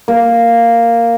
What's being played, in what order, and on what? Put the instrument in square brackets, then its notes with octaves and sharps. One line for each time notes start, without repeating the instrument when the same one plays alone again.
[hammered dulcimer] A#3